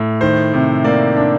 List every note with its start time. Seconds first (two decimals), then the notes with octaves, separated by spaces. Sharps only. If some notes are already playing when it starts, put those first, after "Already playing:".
Already playing: A2
0.21 D#3 C5
0.54 C3
0.84 A#3 D5
1.17 D4